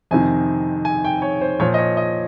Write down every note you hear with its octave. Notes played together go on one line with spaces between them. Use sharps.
F2 C3 D#3 G#5
G#5
G5
C#5
C5
A#2 F3 C#5
D#5
C#5
D#5